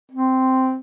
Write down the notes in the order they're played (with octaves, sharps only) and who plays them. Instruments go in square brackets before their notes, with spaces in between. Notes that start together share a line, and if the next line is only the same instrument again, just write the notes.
[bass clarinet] C4